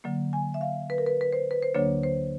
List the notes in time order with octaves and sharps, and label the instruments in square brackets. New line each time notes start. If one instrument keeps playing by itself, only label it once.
[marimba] D3 F#3 A#3
G#5
E5
F5
B4
A#4
B4
B4
C5
B4
C5
D2 D3 F#3 A#3 D4 C#5
C5